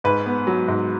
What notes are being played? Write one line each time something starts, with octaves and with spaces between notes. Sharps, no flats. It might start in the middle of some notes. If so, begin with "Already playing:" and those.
G#2 B4
B3
F#3
G#2